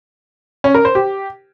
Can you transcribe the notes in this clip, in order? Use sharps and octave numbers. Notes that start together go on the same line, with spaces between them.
C#4
A#4
C5
G4